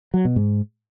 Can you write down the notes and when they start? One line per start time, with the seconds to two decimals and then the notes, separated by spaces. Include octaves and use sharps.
0.14 F#3
0.25 B2
0.36 G#2